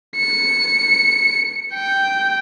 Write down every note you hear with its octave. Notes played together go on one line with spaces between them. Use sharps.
C#7
G5